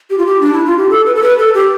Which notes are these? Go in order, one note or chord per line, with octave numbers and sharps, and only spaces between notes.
G4
F4
G4
D4
E4
F4
G4
A4
B4
A4
B4
A4
G4